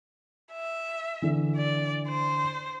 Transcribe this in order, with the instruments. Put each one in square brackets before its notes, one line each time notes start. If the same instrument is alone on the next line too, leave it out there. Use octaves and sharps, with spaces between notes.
[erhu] E5
[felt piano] D3 E3
[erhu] D5
C5